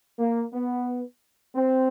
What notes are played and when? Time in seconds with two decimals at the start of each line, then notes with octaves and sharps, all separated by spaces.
0.19 A#3
0.53 B3
1.55 C4